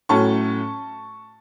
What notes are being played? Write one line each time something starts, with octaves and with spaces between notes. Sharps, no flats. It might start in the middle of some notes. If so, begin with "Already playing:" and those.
A2 F#3 A3 C#4 A5 C#6